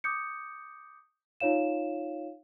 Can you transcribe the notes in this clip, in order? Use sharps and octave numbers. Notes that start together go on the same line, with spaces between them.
D6 D#6 G6 C#7
D#4 F4 C#5 F5 E7